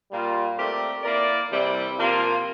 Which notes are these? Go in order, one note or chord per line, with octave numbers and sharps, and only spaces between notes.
A#2 G3 A#3 F4
A3 C4 G4 A#4 D5
A#3 E4 A#4 D5
C3 E3 G3 C4 E4
C3 F3 A#3 F4